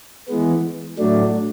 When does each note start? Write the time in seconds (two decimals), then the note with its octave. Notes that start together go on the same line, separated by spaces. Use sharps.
0.28 E3 G#3 B3
0.99 A2 F#3 A3 D4